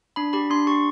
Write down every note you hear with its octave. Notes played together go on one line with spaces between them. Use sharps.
D4 B5
G4 B5
D4 C6
G4 C#6